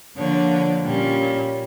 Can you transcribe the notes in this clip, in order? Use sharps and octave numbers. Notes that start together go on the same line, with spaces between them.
D3 F3 A#3 D4 C#5
A#2 G3 C#4